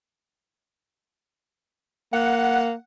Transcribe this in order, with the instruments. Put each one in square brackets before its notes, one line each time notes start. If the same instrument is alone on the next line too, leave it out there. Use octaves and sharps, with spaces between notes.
[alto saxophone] A#3 [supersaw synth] F#5